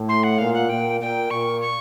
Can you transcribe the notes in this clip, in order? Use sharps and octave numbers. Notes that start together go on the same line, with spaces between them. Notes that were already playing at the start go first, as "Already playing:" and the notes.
Already playing: A2
C6
F#5
A#2 F5
F#5
A#2 G5
A#2 G5
A#2 C#6
C#6